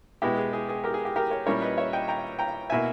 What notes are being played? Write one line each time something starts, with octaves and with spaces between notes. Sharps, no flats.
B2 G#3 B3 E4 G4
G#4
G#4
G#4
G4 A#4
G#4
G4
G4 A#4
A#4 C#5
A#2 G3 C#4 E4 A#4 C#5
B4 D#5
C#5 E5
D#5 G5
G5 A#5
G5 A#5
B2 A#3 E4 E5 G#5